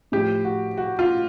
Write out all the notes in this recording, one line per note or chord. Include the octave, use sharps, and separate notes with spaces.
A2 F3 G4
F#4
F#4
F4